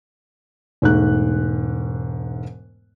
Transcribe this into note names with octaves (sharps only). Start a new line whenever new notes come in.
E1 G#2 A3 F#6